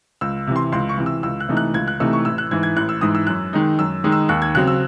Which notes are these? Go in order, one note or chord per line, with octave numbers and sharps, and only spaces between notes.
C#2 E6
C3 E3
C6
C#2 C6
C#6
C3 E3
E6
C#2 E6
F#6
C3 E3 A3 D#4
F#6
C#2 G#6
F#6
C3 E3 A3 D#4 E6
C#6
A1 E6
F#6
G#2 E3 G#6
G#6
A1 F#6
E6
G#2 E3 D#6
E6
F#2 F#6
D#3 G#3 D#4
F#2 E6
D#3 G#3 D#4
E6
D#2 F#6
G#6
C#3 F#3 C4 F#6
E6